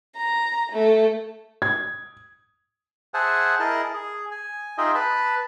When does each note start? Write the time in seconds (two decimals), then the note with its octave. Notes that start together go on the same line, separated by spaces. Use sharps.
0.16 A#5
0.72 A3
1.62 G#6
3.14 G#4 C5 E5 F#5 G#5 A5
3.59 E4 G#4 A#4 D#5 A5
3.94 G#4
4.31 G#5
4.78 D#4 F4 G#4 D#5 E5 G5
4.95 B4 A5 B5